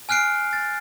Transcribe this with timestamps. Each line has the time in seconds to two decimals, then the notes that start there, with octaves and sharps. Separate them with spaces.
0.09 G#5 F6 F#6 C7 D7
0.53 A6